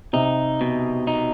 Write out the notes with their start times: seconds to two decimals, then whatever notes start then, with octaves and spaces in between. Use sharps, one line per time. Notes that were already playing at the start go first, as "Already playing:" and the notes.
0.13 C3 D#4
0.61 B2
1.07 D#4